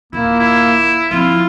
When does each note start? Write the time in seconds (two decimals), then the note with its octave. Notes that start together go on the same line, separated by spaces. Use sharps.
0.13 D#1 A#3 E4 F4
0.39 E4
1.11 F3 C4 E4 F4